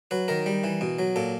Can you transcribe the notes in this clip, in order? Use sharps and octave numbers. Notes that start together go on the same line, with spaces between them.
F#3 B4
D#3 A#4
G3
E3
B2
F#3
A#2 A4